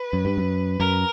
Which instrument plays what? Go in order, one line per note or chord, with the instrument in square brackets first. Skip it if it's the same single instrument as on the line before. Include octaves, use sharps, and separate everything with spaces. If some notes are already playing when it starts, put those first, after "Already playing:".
Already playing: [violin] B4
[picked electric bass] F#2
G2
F#2
[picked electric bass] F#2 [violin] A#4